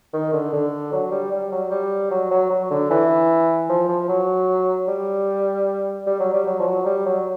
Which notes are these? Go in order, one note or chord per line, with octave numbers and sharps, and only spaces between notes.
D#3
D3
D3
F#3
G3
G3
F#3
G3
F#3
F#3
F#3
D3
E3
F3
F3
F#3
G3
G3
F#3
G3
F#3
F3
F#3
G3
F#3